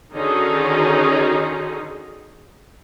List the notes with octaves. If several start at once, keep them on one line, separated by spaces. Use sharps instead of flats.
D3 D#3 C#4 D#4 F#4 G#4